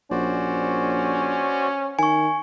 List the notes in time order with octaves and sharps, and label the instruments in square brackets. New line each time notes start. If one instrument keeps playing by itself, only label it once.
[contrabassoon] A#1 [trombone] C#4 [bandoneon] F#4 C5 D5
[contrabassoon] D#3 [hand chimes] G#5 C#6